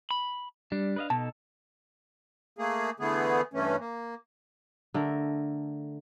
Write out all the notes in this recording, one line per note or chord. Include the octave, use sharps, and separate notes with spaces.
B5
G3 D4
B4 D#5 F5
B2 D#4 A4 A5
A3 A#3 G#4
D3 E3 A3 B3 G#4
G2 E3 A3 C#4
A#3
D3 A3 A#4